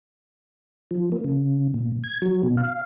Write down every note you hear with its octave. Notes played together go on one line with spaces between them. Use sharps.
F3
A#3
C#3
A#2
G#6
F#3
B2
F5